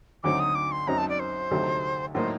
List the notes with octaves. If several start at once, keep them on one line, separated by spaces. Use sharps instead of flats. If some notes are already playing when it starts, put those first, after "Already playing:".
D2 D3 F#3 C4 D#4 D6
D#6
D6
C6
F#2 F#3 C4 D#4 A#5
A5
D5
C5
D2 C3 F#3 A3 D#4
A2 F#3 A#3 D#4 C5